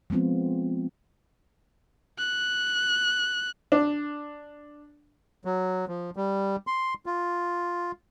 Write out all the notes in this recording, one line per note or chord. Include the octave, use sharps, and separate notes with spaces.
F3 G#3 B3 C4 F4
F#6
D4
F#3
F3
G3
C6
F4